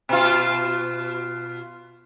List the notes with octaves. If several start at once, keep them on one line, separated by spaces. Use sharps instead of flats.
B2 F4